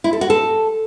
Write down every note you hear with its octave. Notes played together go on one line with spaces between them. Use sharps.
E4
A4
F#4
A4